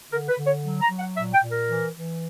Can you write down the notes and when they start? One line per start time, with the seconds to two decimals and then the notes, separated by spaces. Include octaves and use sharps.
0.11 D3 A#4
0.29 B4
0.37 D3
0.46 C#5
0.64 F#3
0.81 A#5
0.90 F#3
0.99 F#5
1.16 A#2 E5
1.33 G5
1.42 A#2
1.51 A#4
1.67 E3
1.94 E3